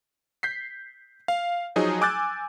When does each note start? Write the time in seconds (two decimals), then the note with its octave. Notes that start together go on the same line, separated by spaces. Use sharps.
0.43 G6 B6 C7
1.28 F5
1.76 F3 F#3 D#4 G#4
2.01 G#5 D6 E6 F#6 G6 A6